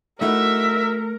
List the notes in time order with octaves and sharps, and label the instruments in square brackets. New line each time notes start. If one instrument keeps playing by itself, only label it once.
[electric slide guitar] A3 [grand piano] D#4 E4 F#4 [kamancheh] A#4 [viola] E5